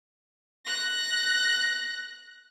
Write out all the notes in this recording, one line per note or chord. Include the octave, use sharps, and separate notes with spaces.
F#6 A#6